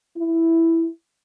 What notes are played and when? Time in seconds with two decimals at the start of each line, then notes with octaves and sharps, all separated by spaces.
0.17 E4